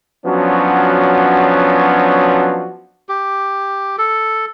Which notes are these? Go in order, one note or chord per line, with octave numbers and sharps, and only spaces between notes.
F3 F#3 B3 C#4 D4 F#4
G4
A4